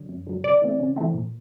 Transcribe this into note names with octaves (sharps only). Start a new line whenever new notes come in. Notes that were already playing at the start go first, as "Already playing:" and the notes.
Already playing: D3 F#3
F#2
D3 F#3
C#3 D5
E3 A3 C4
C#3
E3 A3 C4
A#2